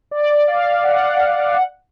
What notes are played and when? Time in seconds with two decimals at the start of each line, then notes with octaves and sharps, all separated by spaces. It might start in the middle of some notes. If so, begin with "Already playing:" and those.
0.11 D5
0.48 F5
0.84 F#5
1.57 F#5